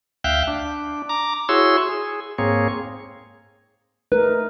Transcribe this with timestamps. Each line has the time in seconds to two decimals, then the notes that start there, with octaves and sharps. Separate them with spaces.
0.24 D2 E5 F5 G5 F#6 G6
0.47 D4
1.09 A#5 D6
1.49 E4 F#4 G#4 C#5 C6 E6
1.89 G#4
2.38 G#2 A#3 C4 G#4 C#5
4.12 A3 D#4 A#4 B4